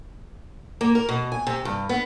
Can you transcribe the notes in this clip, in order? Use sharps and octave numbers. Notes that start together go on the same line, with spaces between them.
A#3
A#4
B2
G#5
C3
G2
B3